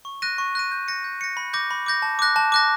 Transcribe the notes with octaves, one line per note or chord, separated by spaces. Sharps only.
C#6
F#6 A#6 D#7
C#6
F#6 A#6 D#7
G6
A#6 C#7
G6
A#6 C#7
B5
D6 G6 A#6
B5
D6 G6 A#6
A5
D6 F#6 A#6
A5
D6 F#6 A#6